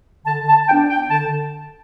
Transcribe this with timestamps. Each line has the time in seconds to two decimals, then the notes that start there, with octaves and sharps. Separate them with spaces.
0.25 D3 A5
0.47 A5
0.67 B3 D4 G5
0.88 G5
1.09 D3 A5